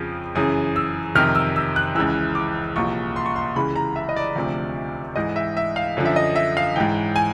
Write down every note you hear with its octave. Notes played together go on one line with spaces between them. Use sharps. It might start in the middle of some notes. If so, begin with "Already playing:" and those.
Already playing: F2 C#3 F3
F#2 C#3 E3 D#6
E6
F2 C3 D#3 F6
E6
E6
F#6
C#2 C#3 E3 E6
D6
C2 A#2 F3 C#6
C6
C#6
C6
C#2 C#3 E3 B5
A#5
E5
D#5
D5
D2 C3 F3
G#2 E3 D#5
E5
E5
F5
F#2 D3 F3
E5
D#5
E5
F5
G#2 E3 G5
G#5